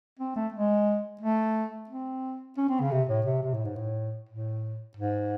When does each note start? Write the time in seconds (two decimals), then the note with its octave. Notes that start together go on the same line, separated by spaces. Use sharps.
0.19 C4
0.36 A3
0.53 G#3
1.21 A3
1.89 C4
2.57 C#4
2.69 C4
2.81 C#3
2.91 C3
3.09 A2
3.26 C3
3.43 C3
3.54 A2
3.65 G#2
3.76 A2
4.29 A2
4.97 G#2